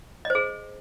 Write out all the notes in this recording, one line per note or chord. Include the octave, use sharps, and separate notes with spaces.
D#5
C5
G#4